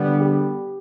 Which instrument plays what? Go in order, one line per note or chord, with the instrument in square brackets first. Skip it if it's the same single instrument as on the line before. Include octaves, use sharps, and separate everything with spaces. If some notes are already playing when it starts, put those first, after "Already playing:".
Already playing: [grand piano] D3 [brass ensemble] G3 B3
[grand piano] G4